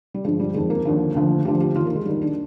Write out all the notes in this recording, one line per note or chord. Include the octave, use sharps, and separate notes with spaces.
G3
G2 D3 F3 G#3
G3
F2 D#3 G#3
A#3
D#2 D3 F3
D2 D3 F3
D2 D3 F3 G4
G4
D#2 D#3 F4
A#3
G#3
D#2 D#3 G3
D4